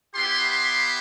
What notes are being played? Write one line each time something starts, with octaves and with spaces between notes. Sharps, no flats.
B3 E4 G4 C6
C6